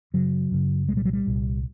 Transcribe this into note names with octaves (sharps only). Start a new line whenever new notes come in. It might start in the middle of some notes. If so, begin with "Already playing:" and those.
F#2 C#3 F#3
F#2 C#3
C2 A#2 G3 G#3
F#3
G3
C2 A#2